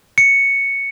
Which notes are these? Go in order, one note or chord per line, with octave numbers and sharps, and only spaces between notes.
C#7